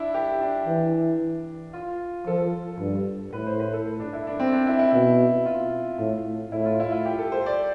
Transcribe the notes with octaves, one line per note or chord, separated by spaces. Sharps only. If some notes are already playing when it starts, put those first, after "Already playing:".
Already playing: D4 E4
G4
D4
E3
F4
F3 A4
G2
A2 B4
C5
B4
A4
A4
D4
E4
D4
C4
D4
E4
E4
B2
F4
A2
A2 E4
F4
E4
F4
G4
A4
C5
D5